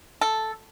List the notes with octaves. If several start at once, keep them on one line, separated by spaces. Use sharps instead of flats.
A4